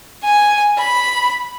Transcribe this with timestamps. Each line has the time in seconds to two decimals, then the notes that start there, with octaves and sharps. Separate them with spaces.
0.24 G#5
0.79 B5